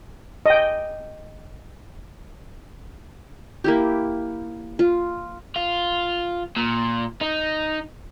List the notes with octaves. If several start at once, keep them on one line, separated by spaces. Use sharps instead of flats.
D#5 G5
A#3 E4 G4
F4
F4
A#2
D#4